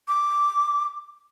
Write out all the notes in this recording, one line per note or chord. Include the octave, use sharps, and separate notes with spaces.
D6